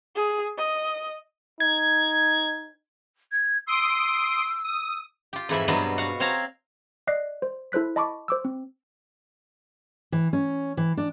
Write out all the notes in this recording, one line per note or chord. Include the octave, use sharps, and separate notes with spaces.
G#4
D#5
D#4 G#6
G#6
C6 D#6 E6 D7
D#6
F4 G4
F2 G#2 E3 B4 E5 B5
G2 B2 F#3 B3 C5 D#5
F#4 F5 F#5
C4 C5 C#5 F5 A#5
D5 D#5 F#6 C7
C5
E4 A4 C5 F#6 B6
D#5 A5 B5 C#6 D6
C5 D6 E6
C4
E3
C#4
E3
D4